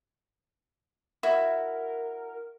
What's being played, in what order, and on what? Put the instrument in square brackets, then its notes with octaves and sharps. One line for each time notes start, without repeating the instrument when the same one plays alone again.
[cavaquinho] E4 F#4 [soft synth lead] A#4